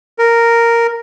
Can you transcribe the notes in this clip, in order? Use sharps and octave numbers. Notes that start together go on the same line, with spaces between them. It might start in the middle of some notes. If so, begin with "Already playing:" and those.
A#4